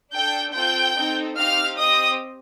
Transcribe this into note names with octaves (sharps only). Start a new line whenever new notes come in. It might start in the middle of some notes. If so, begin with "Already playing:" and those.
D4 A4 G5 G6
C4 F4 A4 G5 G6
C4 D#4 A4
C4 D#4 G4 F5 F6
C4 G4 D#5 D#6